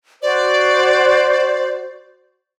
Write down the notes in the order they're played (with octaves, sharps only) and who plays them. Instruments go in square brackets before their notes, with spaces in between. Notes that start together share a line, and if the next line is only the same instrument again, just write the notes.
[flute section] F#4 C5 [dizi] D5